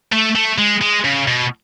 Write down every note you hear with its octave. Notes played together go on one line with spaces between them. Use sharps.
A3
A3
G#3
G#3
C#3
B2